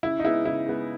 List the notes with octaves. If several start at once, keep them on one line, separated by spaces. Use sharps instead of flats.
C#3 E4
D#4
G#3 B3 E4
C#3 E4
G#3 B3